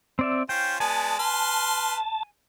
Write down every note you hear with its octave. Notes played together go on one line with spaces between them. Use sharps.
C4 D5 E5
C#4 F4 C5 G5
G#3 B3 D5 G#5 A5
B4 C6 F6